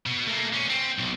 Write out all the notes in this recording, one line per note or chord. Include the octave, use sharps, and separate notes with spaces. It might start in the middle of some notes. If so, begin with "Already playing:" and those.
B2
A3 A#3
D3 C#4
C4
B1